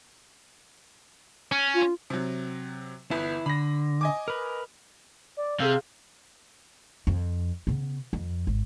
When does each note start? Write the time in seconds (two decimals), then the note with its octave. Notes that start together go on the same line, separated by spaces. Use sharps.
1.52 C#4
1.74 F4
2.10 C3 F#3
3.11 G1 B3 E4 B4
3.46 D3 B5 A#6
4.01 D#5 G#5 D6
4.28 A#4 B4
5.37 D5
5.60 C3 G#4 A4 F5 E6
7.07 F2
7.67 C#3 B3
8.13 F2
8.47 G#1